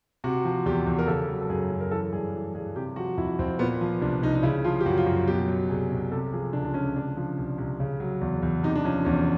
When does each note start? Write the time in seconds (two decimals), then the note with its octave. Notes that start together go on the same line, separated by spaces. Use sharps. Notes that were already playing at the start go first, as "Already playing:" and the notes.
0.24 C3 F#4
0.45 F3
0.66 E2 G4
0.87 E2
0.99 A#4
1.07 C#3 A4
1.29 F#3
1.41 A4
1.50 F#2 G#4
1.71 F#2
1.81 A#4
1.91 E3 A4
2.13 G2 G#4
2.34 E3
2.55 G2 G#4
2.75 C3 G4
2.96 F3 F#4
3.17 F2 E4
3.39 F2 C4
3.59 A#2 B3
3.81 F3
4.01 C2 D4
4.23 C2 D#4
4.35 D#4
4.43 C#3 E4
4.64 F3 F4
4.80 G4
4.86 F#2 F#4
4.98 F4
5.06 F#2 F#4
5.27 B2 G4
5.48 F#3
5.69 C2 G#4
5.91 C2
6.11 C3 A4
6.33 F3 G#4
6.53 C#2 D4
6.65 D4
6.74 C#2 C#4
6.96 C3 D4
7.17 F3
7.38 C2
7.58 C2
7.80 C#3
8.00 F#3
8.21 E2
8.42 E2
8.63 C3 D#4
8.75 D4
8.85 F3 C#4
9.05 E2 C#4